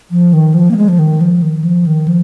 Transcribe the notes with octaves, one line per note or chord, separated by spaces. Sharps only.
F3
D#3
F3
A#3
G#3
F3
D#3
F3
D#3
F3
D#3
F3